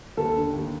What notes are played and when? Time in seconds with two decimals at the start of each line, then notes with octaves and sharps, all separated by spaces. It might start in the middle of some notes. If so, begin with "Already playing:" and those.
0.17 D#2 A4
0.36 D3
0.54 D#2